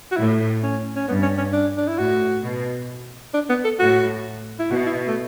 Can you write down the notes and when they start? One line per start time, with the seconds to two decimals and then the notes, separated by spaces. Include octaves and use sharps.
0.12 F#4
0.17 A2 E4
0.63 C#4
0.96 C#4
1.08 G2 B3
1.23 C#4
1.38 C#4
1.53 D4
1.77 D4
1.88 E4
1.99 A2 F#4
2.44 B2
3.34 D4
3.50 B3
3.64 A4
3.80 A2 F#4
4.59 E4
4.71 B2 F#4
4.86 E4
5.07 A3